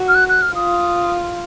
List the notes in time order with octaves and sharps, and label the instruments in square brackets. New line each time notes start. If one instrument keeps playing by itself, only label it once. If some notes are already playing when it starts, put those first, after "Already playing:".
Already playing: [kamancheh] F#4
[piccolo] F6
F#6
F#6
F6
[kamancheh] F4 [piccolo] D#6